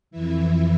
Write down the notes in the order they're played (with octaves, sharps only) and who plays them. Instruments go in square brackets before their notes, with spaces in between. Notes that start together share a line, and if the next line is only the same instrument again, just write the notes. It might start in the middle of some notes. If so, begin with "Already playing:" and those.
[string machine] F2 E3 E4